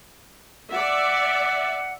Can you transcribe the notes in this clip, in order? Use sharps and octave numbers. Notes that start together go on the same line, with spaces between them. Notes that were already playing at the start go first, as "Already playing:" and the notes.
D5 E5 F#5